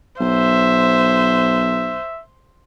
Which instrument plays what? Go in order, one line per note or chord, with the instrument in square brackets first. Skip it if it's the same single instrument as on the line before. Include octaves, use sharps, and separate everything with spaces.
[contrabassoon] B1 [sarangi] C5 [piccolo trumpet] E5